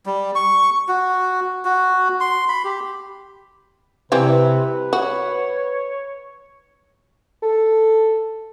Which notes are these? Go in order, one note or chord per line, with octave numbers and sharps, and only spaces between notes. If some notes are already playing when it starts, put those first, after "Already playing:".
G3
C#6
F#4
F#4
C6
B5
G4
C3 E3 G3 C4 B4
F#4 C#5
A4